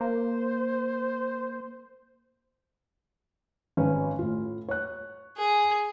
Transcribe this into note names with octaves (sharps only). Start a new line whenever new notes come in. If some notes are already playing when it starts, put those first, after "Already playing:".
A#3 C5
G#1 C#4 B4
A2 F4
C#5 F#6
G#4